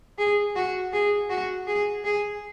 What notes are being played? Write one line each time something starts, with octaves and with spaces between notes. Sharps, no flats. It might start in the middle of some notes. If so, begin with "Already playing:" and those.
G#4
F#4
G#4
F#4
G#4
G#4